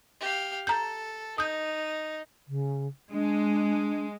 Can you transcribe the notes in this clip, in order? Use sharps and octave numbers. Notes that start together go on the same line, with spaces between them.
G4 F5
A4 A#5 G6
D#4 D#6 G6
C#3
G#3 D4